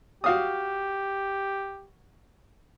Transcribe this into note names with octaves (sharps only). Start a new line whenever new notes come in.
F#4 G4 F5 D#6